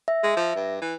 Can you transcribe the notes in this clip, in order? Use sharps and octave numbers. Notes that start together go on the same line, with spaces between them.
E5
G#3
F3
G2
E3